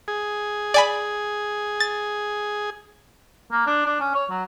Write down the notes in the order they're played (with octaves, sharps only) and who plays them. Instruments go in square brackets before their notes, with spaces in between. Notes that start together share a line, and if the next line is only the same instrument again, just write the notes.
[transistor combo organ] G#4
[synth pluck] D5 G#5 B5
A6
[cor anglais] A#3
D4
D4
C#4
C#5
F#3